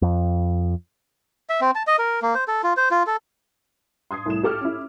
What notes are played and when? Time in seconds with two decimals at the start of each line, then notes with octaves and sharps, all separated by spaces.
0.02 F2
1.49 E5
1.61 C4
1.75 A5
1.87 D#5
1.99 A#4
2.22 A#3
2.35 C5
2.48 A4
2.64 F4
2.77 C5
2.91 F4
3.07 A4
4.11 C6 D#6 G#6 C7
4.26 C2 A2 E7
4.43 G4 A4 D6 F6
4.61 C#4 E4